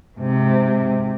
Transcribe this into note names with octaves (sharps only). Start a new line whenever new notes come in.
G#2 C3